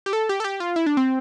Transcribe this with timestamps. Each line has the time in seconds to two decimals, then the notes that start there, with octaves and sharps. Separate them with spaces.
0.06 G4
0.13 A4
0.29 G4
0.40 A4
0.44 G4
0.60 F4
0.76 E4
0.86 D4
0.97 C4